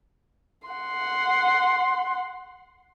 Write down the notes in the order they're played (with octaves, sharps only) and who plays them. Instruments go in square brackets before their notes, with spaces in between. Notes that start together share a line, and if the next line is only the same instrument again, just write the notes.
[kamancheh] F#5 C6